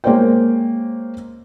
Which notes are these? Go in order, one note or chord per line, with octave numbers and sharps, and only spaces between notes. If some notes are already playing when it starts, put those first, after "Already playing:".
G#3 A#3 A#4 C5 C#5 G5